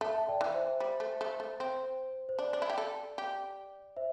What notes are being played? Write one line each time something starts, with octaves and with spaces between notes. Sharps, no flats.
A3 E5 A5
A5
D5 G5
E3
C5 E5
G3
A3
A3
A3
C4 C5
C5
D4 D5
D4
E4
G4
A4
G4
C5 E5